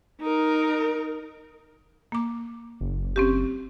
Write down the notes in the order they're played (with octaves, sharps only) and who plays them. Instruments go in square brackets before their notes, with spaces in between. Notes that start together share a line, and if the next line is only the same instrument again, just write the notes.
[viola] D#4 A#4
[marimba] A#3 D6
[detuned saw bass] F#1
[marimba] C4 C#4 G4